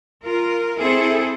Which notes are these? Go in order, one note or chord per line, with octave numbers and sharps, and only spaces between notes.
F4 A#4
C4 E4 G#4 A4